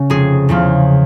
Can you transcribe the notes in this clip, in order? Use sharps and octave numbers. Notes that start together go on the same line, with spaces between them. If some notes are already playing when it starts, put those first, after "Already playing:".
Already playing: C#3 C#4
F1 G#4
E2 C#3 F3